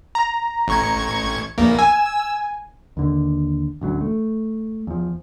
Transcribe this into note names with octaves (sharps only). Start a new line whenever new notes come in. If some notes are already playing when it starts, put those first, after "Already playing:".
A#5
A1 C#6 G#6
A#1 E2 A#3
G#5 E6
D#2 D3
A1 D2 F#3
A3
E2 F3